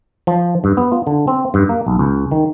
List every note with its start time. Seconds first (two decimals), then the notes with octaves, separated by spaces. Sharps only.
0.27 F3
0.64 G2
0.77 B3
0.92 F4
1.07 D3
1.27 C4
1.54 G2
1.69 A#3
1.86 B1
1.99 C#2
2.31 D#3